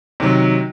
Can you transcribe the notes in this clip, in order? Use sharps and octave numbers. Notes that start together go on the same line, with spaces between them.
C3 D#3 F#3